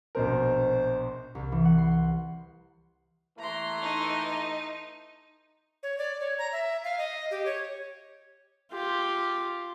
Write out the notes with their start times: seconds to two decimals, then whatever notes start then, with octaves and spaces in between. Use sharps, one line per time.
0.15 A#1 B2 A#4 C5
1.35 C2
1.52 E3
1.65 F#5
1.78 C6
3.39 E3 A3 A#5 C6
3.81 D#4
5.83 C#5
5.98 D5
6.20 C#5
6.38 A#5
6.52 E5
6.84 F5
6.98 D#5
7.31 G4
7.46 C#5
8.72 F4 G4